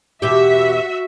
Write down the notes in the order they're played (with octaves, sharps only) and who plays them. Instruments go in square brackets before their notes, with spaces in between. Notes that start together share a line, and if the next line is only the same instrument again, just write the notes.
[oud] E2 B2 G4 [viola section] F#4 E5